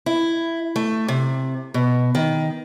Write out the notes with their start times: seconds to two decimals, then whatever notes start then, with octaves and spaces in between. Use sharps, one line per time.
0.06 E4
0.76 A3
1.08 C3
1.74 B2
2.15 D#3